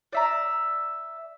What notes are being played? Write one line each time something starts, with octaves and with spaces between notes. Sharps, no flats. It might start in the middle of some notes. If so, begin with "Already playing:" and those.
D5 E5 A#5